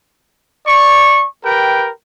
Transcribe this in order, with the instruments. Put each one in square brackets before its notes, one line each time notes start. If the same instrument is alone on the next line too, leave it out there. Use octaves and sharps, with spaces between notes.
[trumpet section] D5 C#6
G4 A#4 B4 G5